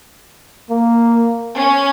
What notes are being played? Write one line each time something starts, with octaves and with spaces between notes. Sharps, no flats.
A#3
C#4